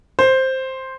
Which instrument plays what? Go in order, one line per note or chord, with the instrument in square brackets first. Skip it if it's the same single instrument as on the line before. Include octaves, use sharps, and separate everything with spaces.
[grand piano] C5